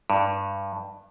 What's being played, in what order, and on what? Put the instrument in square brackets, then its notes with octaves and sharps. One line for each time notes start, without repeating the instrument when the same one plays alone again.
[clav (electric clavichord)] G2